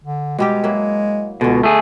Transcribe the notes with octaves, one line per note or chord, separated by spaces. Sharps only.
D3
B2 G3 G#3 G4
F#3 A#3 E4
C#2 B2 D3 C#4
A3 G#4